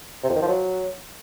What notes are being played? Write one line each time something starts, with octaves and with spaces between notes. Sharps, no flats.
C3
F2
D#3
F3
F#3